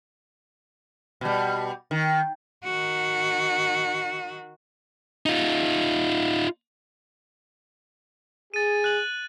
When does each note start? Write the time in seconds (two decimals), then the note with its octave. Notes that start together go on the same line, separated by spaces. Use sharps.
1.21 B2 G3
1.91 D#3
2.64 D#3 F#4
5.26 D#4 F4
8.54 G#4 A6 D#7
8.84 F#6 F#7